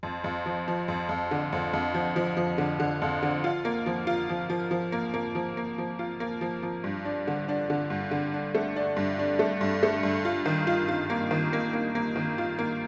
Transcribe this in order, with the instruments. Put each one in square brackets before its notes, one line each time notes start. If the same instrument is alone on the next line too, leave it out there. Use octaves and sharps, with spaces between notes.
[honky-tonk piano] F2
F2
F3
F3
F2
F2
D3
F2
F2
F3
F3
F3
D3
D3
F2
D3
F4
A#3
F3
F4
F3
F3
F3
A#3
A#3
F3
A#3
F3
F4
A#3
F3
F3
G2
D4
D3
D4
D3
G2
D3
D4
A3
D4
G2
D4
A3
G2
A3
G2
F4
D#3
F4
F4
A#3
D#3
A#3
A#3
A#3
D#3
F4
A#3